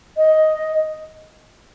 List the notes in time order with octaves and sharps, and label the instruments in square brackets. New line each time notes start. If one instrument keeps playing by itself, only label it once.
[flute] D#5